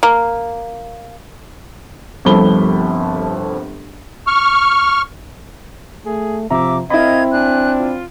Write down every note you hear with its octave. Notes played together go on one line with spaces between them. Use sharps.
A#3
G1 C2 F3 A4 B5 G7
C#6 F6
A3 G#4
C3 F3 E5 A#5 D6
C4 E4 A#4 D#5 F5 B5 G#6
D4 G#5 F#6
F4